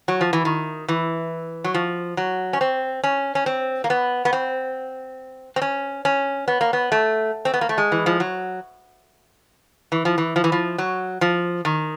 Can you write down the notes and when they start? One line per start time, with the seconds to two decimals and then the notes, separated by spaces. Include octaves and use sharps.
0.08 F#3
0.21 F3
0.33 E3
0.45 D#3
0.88 E3
1.64 F#3
1.74 F3
2.17 F#3
2.53 C#4
2.61 C4
3.04 C#4
3.35 C#4
3.46 C4
3.84 A#3
3.90 B3
4.25 B3
4.33 C4
5.56 C4
5.62 C#4
6.05 C#4
6.48 B3
6.61 A#3
6.73 B3
6.92 A3
7.45 C4
7.54 B3
7.61 A#3
7.69 A3
7.78 G#3
7.92 E3
8.06 F3
8.20 F#3
9.92 E3
10.05 F3
10.18 E3
10.36 F3
10.44 E3
10.52 F3
10.78 F#3
11.21 F3
11.65 D#3